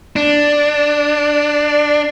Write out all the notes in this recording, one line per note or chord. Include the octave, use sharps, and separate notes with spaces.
D4